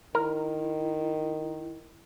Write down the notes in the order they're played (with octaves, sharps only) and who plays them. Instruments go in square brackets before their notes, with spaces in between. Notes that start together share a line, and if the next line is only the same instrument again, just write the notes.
[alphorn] D#3 [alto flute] E4 [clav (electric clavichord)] A#4